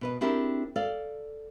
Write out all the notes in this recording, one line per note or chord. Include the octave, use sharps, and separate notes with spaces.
B2 B4 D#5
C4 D4 E4 G4 G#4 A#4
A4 D5 F5